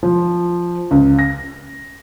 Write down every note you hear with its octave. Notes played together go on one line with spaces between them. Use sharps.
F3
C#2
A#6